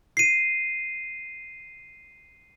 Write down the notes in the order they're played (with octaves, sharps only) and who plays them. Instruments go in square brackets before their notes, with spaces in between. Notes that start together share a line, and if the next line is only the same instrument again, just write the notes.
[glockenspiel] C7 D#7